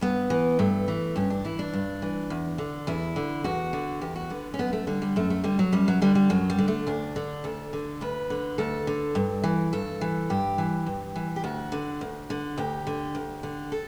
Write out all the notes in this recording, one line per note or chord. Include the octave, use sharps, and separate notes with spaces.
G2 B3
E3
G2 A3
E3
G2 C#4
D4
E3 E4
D4
G2
E3
E2
D3
E2 E4
D3
E2 F#4
D3
E2 G4
F#4
D3 B3
C#4
F#2 B3
A3
D3 G3
G3
F#2 A3
A3
D3 G3
F#3
F#2 G3
F#3
D3 G3
G3
F#2 F#3
G3
D3
A3
D2 D4
D3
D2 A4
D3
D2 B4
D3
D2 A4
D3
G2
E3
G2 A4
E3
G2 G4
E3
G2
E3
G4
D2 F#4
D3
D2
D3
D2 G4
D3
D2
D3
A4